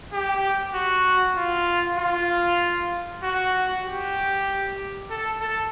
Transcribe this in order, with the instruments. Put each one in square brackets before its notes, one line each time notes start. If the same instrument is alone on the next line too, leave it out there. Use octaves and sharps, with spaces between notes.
[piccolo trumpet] G4
F#4
F4
F4
F#4
G4
A4
A4